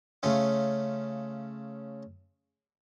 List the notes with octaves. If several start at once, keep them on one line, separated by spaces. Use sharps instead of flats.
C#3 A3 C#4 F4